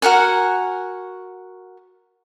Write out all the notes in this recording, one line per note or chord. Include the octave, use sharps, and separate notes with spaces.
F#4 A#4 F#5 G#5